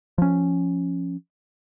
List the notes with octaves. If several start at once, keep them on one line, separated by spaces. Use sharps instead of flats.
F3 C#4